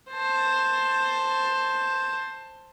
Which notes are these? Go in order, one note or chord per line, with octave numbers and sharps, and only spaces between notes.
C5 A5